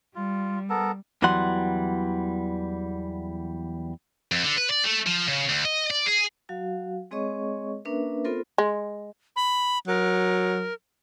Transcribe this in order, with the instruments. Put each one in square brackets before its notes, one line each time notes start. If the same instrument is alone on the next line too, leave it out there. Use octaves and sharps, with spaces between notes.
[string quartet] G3 [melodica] F4
[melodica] B3 A4 A#4
[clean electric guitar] E2 E3 F#3 G3 F#5 C6
[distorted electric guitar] F2
D3
B4
D5
A3
F3
C#3
D2
D#5
D5
G#4
[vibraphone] F#3 F#4 F5
G#3 C4 G#4 C#5 D#5 C#6
A#3 C#4 D4 A#4 B4 E5
B3 C4 F4 A4 A#4 C5
[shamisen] G#3
[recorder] B5
[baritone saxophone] F#3 [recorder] A#4